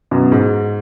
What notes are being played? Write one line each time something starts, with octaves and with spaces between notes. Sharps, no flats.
F#2 B2
G#2